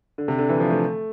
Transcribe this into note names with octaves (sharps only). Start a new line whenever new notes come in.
D3
C3
D3
E3
F3
A3